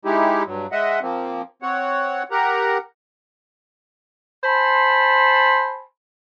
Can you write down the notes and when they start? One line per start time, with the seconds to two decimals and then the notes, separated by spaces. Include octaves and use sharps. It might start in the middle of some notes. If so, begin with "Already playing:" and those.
0.05 G#3 D#4 E4 G4
0.46 G2 F#3
0.72 G#3 D#5 E5 F#5
1.02 F3 A#3 C4
1.62 C4 C#5 F#5
2.31 G4 A#4 F#5 A#5
4.44 C5 G#5 A5 B5 C6